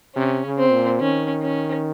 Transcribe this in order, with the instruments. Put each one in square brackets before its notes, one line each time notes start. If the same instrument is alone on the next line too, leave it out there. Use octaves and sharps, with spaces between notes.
[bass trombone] C3 [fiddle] C#4
[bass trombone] C#3
[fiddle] C4
[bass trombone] A#2
[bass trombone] D#3 [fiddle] C#4
[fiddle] C#4